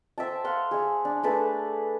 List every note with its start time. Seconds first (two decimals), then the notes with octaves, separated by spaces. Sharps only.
0.18 C5 E5 G5 A5
0.44 F5 F#5 C6
0.71 G#4 E5
1.05 D4
1.23 A3 G#4 A4 B4